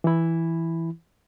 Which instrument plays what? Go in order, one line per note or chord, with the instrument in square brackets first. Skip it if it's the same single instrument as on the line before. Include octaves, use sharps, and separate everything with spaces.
[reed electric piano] E3 E4